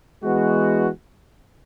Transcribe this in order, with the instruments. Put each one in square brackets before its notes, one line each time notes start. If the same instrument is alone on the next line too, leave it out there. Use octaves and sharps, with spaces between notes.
[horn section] E3 G#3 B3 F#4